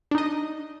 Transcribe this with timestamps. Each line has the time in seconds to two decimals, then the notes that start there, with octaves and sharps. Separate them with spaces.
0.11 D4
0.15 D#4
0.18 D#5